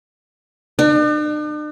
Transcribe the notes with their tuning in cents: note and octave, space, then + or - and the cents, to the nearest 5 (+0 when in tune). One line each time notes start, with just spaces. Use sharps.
D4 +45